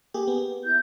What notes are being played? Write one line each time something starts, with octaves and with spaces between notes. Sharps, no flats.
A#3 G4 G#4
B3
E4 G6